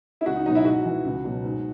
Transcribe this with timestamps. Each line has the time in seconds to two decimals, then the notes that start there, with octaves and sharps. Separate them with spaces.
0.21 E4
0.26 C#2 F#4
0.35 D#4
0.46 B2 F#3 D#4
0.55 E4
0.65 G#2 F#4
0.84 E3
1.04 C#2
1.24 B2 F#3
1.44 G#2